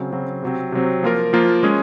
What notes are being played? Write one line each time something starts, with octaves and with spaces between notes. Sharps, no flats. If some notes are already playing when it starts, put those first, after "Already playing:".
Already playing: C#3 F#3 C4
C#3 F#3 C4
C3 F#3 C4
C3 F#3 C4
F3 A#3 F4 A#4
F3 A#3 F4 A#4
G#3 C#4 G#4